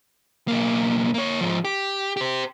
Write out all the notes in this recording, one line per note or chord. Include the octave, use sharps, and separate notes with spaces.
B1 A#3
A#3 C#5
G#2 F3
G4
G4 C5